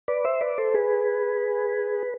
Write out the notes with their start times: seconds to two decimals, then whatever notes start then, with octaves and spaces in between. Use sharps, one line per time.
0.08 B4 D5
0.25 C5 E5
0.41 B4 D5
0.58 A4 C5
0.74 G#4 B4